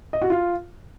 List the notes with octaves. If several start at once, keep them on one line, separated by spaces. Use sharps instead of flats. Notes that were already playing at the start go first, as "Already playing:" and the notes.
D#5
F#4
F4